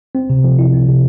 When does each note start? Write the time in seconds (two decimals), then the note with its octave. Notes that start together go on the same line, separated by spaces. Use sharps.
0.15 C4
0.30 C3
0.44 F3
0.59 E4
0.73 C4
0.88 C3